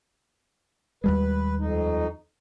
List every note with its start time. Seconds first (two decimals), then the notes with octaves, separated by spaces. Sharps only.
1.04 D#2 G3 G#3 B4
1.59 F2 D#4